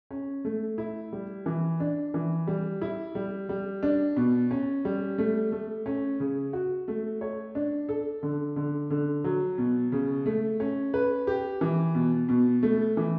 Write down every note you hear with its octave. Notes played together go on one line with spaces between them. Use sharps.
C#4
A3
E4
G3
E3
D4
E3
G3
E4
G3
G3
D4
B2
C#4
G3
A3
A3
C#4
C#3
F#4
A3
C#5
D4
A4
D3
D3
D3
F#3
B2
C#3
A3
C#4
B4
G4
E3
B2
B2
A3
E3